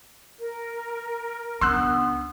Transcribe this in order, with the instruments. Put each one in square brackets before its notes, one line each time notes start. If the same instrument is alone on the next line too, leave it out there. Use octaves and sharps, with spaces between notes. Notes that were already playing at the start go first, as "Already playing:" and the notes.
[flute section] A#4
[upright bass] C#2 D4 [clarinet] B3 [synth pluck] C6 E6 F#6